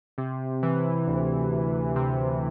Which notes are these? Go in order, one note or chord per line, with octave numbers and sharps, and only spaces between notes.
C3
E3
D2
D2
C3